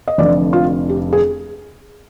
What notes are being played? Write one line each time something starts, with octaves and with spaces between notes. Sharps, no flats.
D#5
F1 F2 D3 D5
F4
G4
G#4